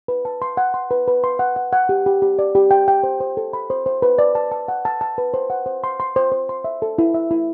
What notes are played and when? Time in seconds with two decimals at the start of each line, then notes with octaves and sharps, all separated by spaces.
0.08 B4
0.25 A5
0.42 C6
0.57 F#5
0.74 C6
0.91 B4
1.08 B4
1.24 C6
1.39 F#5
1.56 F#5
1.73 F#5
1.89 G4
2.06 G4
2.22 G4
2.39 D5
2.55 G4
2.71 G5
2.88 G5
3.04 C5
3.20 C5
3.37 A4
3.53 B5
3.70 C5
3.86 C5
4.02 B4
4.19 D5
4.35 A5
4.51 A5
4.68 F#5
4.85 A5
5.01 A5
5.18 B4
5.34 C5
5.50 F#5
5.66 C5
5.84 C6
6.00 C6
6.16 C5
6.32 C5
6.49 C6
6.64 E5
6.82 A4
6.98 E4
7.14 E5
7.31 E4